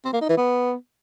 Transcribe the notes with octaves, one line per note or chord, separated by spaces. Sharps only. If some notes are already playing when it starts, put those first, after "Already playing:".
C4
A#3
D#4
E3
B3